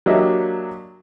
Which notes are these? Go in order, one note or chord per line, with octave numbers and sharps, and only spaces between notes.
F#3 A#3 D4 G4 D#5 E5